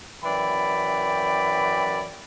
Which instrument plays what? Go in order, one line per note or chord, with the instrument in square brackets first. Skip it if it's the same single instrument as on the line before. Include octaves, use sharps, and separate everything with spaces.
[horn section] F#2 E3 D5 G5 B5